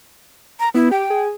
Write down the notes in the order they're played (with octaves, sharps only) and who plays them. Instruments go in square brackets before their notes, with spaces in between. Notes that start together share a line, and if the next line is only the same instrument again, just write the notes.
[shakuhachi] A#5
[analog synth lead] B3 [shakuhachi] E4
[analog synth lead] G4 [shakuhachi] G5
[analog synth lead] G#4